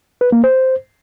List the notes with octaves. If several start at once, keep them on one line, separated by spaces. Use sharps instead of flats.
B4
A#3
C5